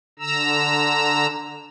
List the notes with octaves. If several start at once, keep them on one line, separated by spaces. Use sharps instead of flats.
D3 A#5 E6